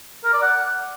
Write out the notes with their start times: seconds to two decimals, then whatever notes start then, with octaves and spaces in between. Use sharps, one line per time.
0.24 A#4
0.33 D5
0.42 F#5